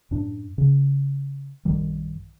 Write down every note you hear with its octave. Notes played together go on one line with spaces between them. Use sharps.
F#2 A2 D4
C#3
A#1 F#2 D#3 G3